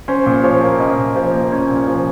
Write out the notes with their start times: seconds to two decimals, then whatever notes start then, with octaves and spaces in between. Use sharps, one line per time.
0.08 C#4 C5
0.26 A#2
0.44 F3 C#5
0.62 A#3
0.80 C#4 D#5
0.98 A#2
1.16 F3
1.34 A#3
1.52 C#4
1.70 A#2
1.88 F3